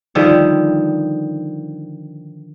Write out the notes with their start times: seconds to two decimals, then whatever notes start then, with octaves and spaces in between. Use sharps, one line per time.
0.15 D3 D#3 F3 G3